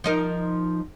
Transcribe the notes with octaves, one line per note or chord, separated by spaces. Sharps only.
F3 D#4 A#4